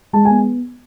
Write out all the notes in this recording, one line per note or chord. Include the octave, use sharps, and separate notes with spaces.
G#3 A5
B3 G#5